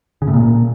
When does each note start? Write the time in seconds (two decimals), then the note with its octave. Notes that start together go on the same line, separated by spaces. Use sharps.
0.22 C#3
0.28 A2
0.33 A#2